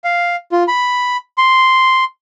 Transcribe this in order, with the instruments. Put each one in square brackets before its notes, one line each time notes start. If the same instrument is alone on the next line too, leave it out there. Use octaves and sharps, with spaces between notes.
[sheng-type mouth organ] F5
F4
B5
C6